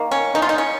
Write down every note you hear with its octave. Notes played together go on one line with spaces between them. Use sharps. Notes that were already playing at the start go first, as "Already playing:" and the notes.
Already playing: D#3 A#3
C#4
D#4
F4
D#4
C#4